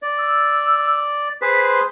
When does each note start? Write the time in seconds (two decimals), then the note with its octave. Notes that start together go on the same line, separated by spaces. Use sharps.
0.02 D5
0.18 E6
1.42 G#4 B4 C5 B6
1.64 C6